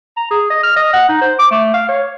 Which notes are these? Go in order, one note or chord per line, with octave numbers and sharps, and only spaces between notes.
A#5
G#4
D#5
F6
D#5
F#5
D#4
C5
D6
A3
F5
C#5